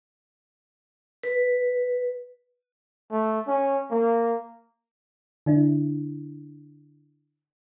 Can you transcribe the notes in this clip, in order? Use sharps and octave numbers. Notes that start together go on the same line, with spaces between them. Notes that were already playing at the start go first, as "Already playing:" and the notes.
B4
A3
C#4
A#3
D3 D4 E4